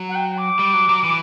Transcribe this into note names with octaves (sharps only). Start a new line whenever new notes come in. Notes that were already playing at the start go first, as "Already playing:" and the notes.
Already playing: F#3
F#5
G5
D6
G3
F#3
F#3
E3